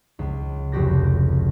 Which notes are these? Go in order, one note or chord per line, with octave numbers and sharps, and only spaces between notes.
C#2
F1 F#4 G4 A#6